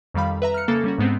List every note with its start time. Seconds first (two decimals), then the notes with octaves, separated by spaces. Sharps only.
0.14 F2 D#3 G3 F5 B5
0.42 B4 E5 A#5
0.54 F6 F#6 C#7
0.68 C#3 A#3 A4 A6
0.84 G3 C#4 F#4
0.98 G#2 G#3 B3 C4